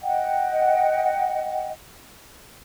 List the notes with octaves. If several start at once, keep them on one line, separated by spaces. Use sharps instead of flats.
D#5 F#5 G5